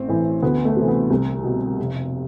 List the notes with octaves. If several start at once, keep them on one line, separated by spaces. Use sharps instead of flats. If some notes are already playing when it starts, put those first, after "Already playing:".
Already playing: A1 C4
A2 E3
D2 B3
A3
C3 E3
B3
C2
B2
F1